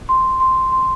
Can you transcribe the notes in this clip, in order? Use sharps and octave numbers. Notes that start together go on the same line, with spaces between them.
C6
C6
C6